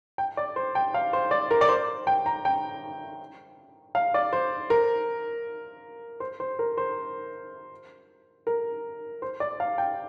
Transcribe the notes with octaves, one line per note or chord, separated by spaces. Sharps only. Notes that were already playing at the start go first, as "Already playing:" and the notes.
G5
D5
C5
G5
F5
C5
D5
A#4
D5
C5
G5
A#5
G5
F5
D5
C5
A#4
C5
C5
A#4
C5
A#4
C5
D5
F5
G5